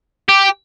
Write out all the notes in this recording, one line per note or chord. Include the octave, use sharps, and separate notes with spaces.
G4